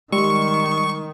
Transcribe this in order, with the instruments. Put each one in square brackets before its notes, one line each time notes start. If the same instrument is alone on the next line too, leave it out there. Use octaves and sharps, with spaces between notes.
[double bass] D#3 [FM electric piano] G3 [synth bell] G#3 [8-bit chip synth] C#6